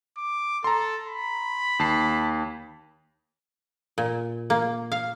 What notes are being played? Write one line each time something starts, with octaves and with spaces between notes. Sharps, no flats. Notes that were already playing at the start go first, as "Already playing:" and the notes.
D6
A4 A#5 C6
B5
D#2 A5 C7
A#2
A#3
F5